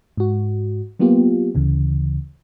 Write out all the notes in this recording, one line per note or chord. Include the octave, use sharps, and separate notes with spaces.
G#2 F#4
F#3 A#3 B3 F4 G4
D2 C#3 E3